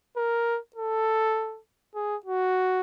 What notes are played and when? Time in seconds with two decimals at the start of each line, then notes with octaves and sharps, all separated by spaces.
0.17 A#4
0.76 A4
1.95 G#4
2.26 F#4